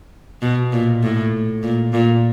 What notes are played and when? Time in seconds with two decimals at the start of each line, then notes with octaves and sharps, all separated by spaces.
0.42 B2
0.72 A#2
1.03 A2
1.63 A#2
1.93 A#2